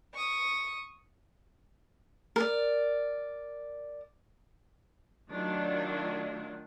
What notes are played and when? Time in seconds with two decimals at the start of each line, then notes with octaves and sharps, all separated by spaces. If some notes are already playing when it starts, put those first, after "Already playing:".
0.14 C#6 D#6
2.36 A#4 D5
5.31 D#3 F#3 A3 D4 F4